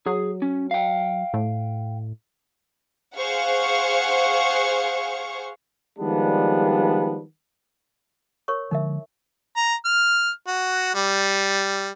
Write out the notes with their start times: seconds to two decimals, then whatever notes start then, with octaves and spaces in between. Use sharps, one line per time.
0.06 F#3 G#4
0.42 C#4
0.71 F5 G5
1.34 A2
3.16 G#4 C5 F5 F#5 C#6
5.99 D#3 F3 G3 G#3 B3 D4
8.48 A#4 C#5 C#6
8.71 D3 F3 G#3 D#4 A#4 E5
9.57 A#5
9.85 F6
10.47 F#4
10.95 G3